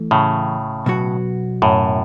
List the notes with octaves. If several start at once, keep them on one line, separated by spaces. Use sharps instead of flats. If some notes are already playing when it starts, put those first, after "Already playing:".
Already playing: E3 A3
A2 C#3
B2 F#3 B3 F#4 C#5
F#2 A2